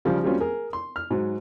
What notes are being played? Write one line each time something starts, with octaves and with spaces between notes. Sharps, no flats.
C#3 F3 G3
F#3 G3 A#3 C4 C#4 F4
G#4 A#4
C6
F6
G#2 F#3